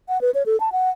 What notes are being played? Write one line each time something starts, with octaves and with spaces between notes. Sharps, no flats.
F#5
B4
C#5
A4
A5
F#5